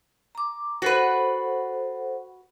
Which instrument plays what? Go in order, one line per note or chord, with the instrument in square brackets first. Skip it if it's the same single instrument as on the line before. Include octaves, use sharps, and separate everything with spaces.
[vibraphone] A#5 D6
[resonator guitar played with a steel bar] F#4 B4 [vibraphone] A4 C5 F#5